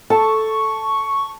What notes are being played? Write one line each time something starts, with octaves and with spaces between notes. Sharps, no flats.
A4 A5 C#6